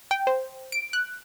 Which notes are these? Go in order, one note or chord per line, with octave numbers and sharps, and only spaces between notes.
G5
C5
D7
F#6